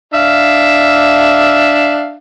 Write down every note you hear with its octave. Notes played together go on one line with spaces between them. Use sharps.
D4 E5 F5